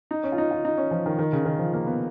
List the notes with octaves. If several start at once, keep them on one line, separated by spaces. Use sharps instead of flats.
D#4
C#4
F4
D#4
F4
D#4
C#4
F3
D#3
D#3
C#3
D#3
F3
A#3
B3